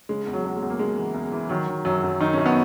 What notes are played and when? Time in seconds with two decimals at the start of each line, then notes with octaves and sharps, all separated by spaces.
0.09 C#3 G#3
0.27 E2
0.33 F#3
0.45 E2
0.56 G#3
0.62 E2
0.70 A#3
0.79 C#3 G#3
0.97 E3
1.14 E2
1.32 E3
1.49 D#3 F#3
1.68 D#3
1.85 F#2 F#3
2.03 F#2
2.20 D#3 D#4
2.33 F#2 C#4
2.46 B3